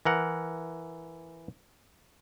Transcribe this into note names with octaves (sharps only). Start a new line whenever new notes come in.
E3 A#4 F#5